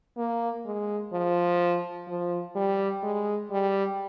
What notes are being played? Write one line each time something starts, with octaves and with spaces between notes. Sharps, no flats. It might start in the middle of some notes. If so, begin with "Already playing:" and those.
A#3
G#3
F3
F3
G3
G#3
G3